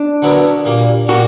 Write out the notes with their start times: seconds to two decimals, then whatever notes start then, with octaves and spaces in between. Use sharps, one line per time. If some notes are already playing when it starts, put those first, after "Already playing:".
Already playing: D4
0.22 D3 F#3 B3 E4 A#4
0.65 A#2 G3 A#3
1.08 A#2 G3 A#3 F#4